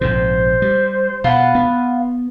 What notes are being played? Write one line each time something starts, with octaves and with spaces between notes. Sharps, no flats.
A#1 G#2 C3 C5
G3
B2 F4 B4 F#5
B3